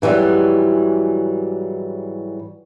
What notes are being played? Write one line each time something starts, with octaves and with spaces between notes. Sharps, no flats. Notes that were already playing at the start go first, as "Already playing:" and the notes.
G#2 E3 F#3 G3